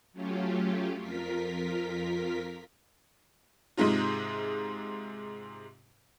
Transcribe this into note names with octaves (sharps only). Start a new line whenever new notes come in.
F#3 A3 C#4 F4 G4
F2 F4 A#4 B6
G#2 C3 G#3 D#4 F4